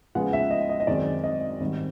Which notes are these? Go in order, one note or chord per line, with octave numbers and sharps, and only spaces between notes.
C#3 F3 G#3 B3 F#5
E5
D#5
D#5
D#5
F#2 D#3 G#3 C4 D5
D#5
G#2 D#3 G3 C4